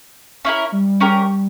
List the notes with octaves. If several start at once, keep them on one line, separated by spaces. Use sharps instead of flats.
C#4 E4 A#4
G3
C#4 G4 A#4